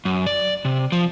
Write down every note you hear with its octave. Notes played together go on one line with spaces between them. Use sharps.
F#2
D5
C3
F3